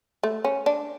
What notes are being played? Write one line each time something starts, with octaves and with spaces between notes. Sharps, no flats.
A3
C#4
D4